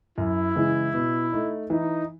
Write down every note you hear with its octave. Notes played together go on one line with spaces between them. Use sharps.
F#2 E4
C#3 E3 G#3
B2
A3 D#4
E3 D#4